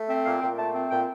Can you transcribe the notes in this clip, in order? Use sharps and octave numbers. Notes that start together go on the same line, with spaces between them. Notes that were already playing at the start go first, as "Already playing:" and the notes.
Already playing: A3
C4 E5
A#2 F5
A#2 G5
A3 A5
C4
A#2 G5